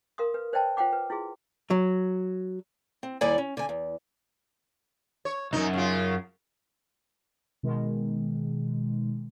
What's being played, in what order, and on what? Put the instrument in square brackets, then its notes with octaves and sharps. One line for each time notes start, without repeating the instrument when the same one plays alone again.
[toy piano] A#4 F5 C6 D#6
B4
B4 C5 D5 D#5 G5 A5
F4 C5 F#5 G5 B5 D6
B4
E4 F4 G#4 C6
[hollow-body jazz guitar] F#3
[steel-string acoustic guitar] C4
D#2 G3 E4 D5 G#5
C#4
D3 G#5
E2
[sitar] C#5
[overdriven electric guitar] C2 F#2 [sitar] D#4
[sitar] C#3 F4
[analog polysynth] B2 D#3 G#3